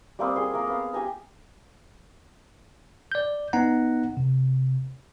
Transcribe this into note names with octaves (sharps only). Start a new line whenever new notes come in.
G3 A#3 C4 D#6
G#4 C6
A#3 A#4
B3 F5
G4 G5 G#5 A#5
D5 G6
B3 D#4 F#5 A#5
C3